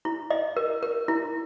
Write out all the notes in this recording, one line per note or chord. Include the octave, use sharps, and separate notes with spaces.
E4
D#5
A#4
A#4
E4